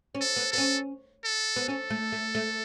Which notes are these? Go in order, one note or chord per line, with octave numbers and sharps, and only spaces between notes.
C#4
A4
B3
B3 A4
C#4
A4
B3
C#4 A4
A3
A3
A3